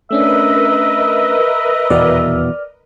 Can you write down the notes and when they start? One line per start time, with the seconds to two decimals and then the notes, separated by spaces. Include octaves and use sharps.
0.11 A3 C#4 D4 A#4 B4 D#5 E5
1.90 D#1 E2 B2 D5 F6